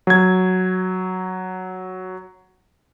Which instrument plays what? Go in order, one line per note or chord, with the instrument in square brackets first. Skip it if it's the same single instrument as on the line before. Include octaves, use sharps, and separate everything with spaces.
[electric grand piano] F#3 G#6